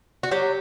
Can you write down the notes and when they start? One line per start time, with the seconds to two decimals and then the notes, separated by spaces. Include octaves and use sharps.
0.23 F#4
0.31 F#3 G4